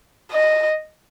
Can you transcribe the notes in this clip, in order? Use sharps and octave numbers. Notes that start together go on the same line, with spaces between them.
D#5